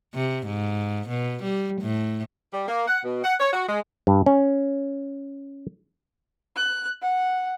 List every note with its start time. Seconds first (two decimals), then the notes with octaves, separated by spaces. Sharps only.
0.15 C3
0.47 G#2
1.09 B2
1.43 G3
1.82 A2
2.53 G3
2.68 A#3
2.88 F#5
3.05 B2
3.24 F#5
3.40 C#5
3.53 F#4
3.69 G#3
4.07 G2
4.26 C#4
6.56 F#6
7.02 F#5